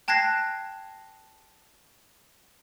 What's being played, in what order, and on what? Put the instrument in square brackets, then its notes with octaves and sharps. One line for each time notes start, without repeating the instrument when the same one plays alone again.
[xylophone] G5 A5 F#6 G#6 A#6 C7